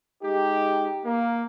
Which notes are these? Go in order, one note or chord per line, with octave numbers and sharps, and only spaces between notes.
G#3 D#4 G4
A#3